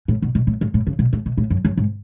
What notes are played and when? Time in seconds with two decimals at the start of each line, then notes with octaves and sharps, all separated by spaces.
0.08 A2
0.22 B2
0.35 B2
0.47 A2
0.61 A2
0.74 A2
0.87 C#3
0.99 B2
1.13 A2
1.26 B2
1.38 A2
1.50 F#2
1.65 F#2
1.77 G#2